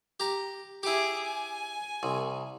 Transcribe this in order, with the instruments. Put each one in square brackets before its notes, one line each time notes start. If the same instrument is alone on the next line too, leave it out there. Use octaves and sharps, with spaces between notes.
[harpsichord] G4 A#5
[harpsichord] E4 G4 [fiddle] G#4 D6
[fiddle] G#5
[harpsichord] C2